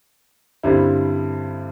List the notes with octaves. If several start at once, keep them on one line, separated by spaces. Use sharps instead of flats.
G2 D3 G3 C4 E4